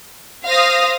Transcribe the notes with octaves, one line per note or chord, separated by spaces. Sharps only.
C5 F5 D#6 A#6